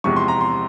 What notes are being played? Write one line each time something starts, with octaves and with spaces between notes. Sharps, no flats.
E2 C3 F3 G#3 C#6
C6
A#5
C6